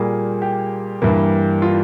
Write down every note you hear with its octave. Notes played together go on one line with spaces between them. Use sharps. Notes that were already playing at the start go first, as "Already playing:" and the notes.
Already playing: A#2 G3 A#3 G#4
G4
G2 E3 G3 A#3
F4